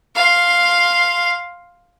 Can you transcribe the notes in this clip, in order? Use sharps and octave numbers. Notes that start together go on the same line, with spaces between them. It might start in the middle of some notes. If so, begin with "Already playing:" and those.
F5 C6